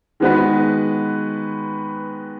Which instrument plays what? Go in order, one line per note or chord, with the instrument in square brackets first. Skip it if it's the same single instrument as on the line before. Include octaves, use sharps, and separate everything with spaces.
[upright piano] D#3 G#3 B3 F#4 B4